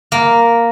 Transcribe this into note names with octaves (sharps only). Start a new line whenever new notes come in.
A#3